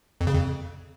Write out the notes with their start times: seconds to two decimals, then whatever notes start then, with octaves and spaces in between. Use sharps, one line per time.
0.21 F2
0.27 C#3
0.34 F2